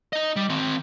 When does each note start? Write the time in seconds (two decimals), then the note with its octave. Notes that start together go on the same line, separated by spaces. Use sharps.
0.13 D#4 D#5
0.36 G3
0.50 D#3 C4